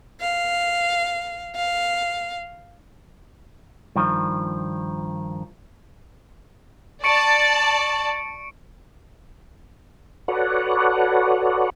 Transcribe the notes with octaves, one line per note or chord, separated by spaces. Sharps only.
F5
F5
G2 D#3 F3
D5 A5 C#6 C#7 D7
F#4 A4 B4 C#5 D5 F#5